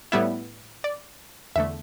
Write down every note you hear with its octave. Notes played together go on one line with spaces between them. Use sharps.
A2 G3 B3 E4 E5
D5
E2 D3 A3 E5